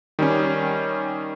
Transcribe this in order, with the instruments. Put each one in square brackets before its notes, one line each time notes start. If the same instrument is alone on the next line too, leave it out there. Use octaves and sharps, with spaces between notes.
[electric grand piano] D#3 G3 C#4